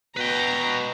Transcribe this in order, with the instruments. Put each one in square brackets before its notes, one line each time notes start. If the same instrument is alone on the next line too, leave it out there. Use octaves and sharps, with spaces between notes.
[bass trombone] B2 [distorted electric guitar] B4 G5 [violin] A#5